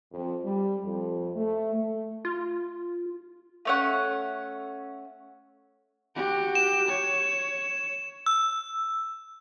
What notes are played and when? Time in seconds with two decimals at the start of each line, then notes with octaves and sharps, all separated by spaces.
0.12 F2
0.45 G3
0.84 F2
1.35 A3
1.75 A3
2.25 F4
3.65 A3 C#4 F#5
6.16 F#4 G4
6.55 E7
6.88 C#5
8.26 E6